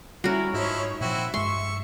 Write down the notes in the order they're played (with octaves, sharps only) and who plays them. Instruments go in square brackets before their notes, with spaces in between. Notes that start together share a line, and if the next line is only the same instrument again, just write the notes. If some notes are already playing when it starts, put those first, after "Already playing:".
[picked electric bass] G3 [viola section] C#4 E4 [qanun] F#4 A#4
[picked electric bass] G#2 [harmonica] F3 E4 [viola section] D#4 C#5
[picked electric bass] A#2 F3 [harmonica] C4 E4 F#4 [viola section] E5
[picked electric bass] G2 G#3 [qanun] C6 [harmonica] C#6